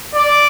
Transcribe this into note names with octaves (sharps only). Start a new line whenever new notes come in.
D5